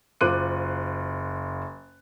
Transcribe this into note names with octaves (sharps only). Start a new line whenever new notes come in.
F#1 F4 C5 D6 F#6 D#7